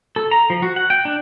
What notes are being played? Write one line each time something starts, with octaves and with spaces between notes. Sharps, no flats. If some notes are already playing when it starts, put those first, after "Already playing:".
A4
A#5
F3
F#4
F#5
G5
D4